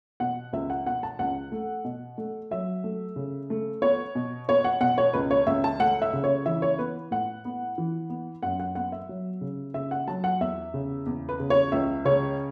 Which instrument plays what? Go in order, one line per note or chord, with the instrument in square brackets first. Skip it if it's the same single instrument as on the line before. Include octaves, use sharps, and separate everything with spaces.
[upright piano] B2 F#5
C#2 E5
F#5
B2 F#5
A5
C#2 F#5
A3
B2
A3
F#3 E5
A3
C#3
A3
B3 C#5
B2
B3 C#5
F#5
B2 F#5
C#5
C#2 B4
C#5
C#2 E5
A5
A3 F#5
E5
C#3
C#5
E3 E5
C#5
B3 B4
A2 F#5
B3
E3
B3
F#2 F#5
F#5
B3 F#5
E5
F#3
C#3
C#3 E5
F#5
F#3 A5
F#5
E2 E5
C#3
E2
B4
C#3
C#5
C#2 E5
C#3 C#5